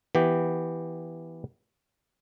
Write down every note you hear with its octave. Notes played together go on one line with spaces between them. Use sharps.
E3 B3 G4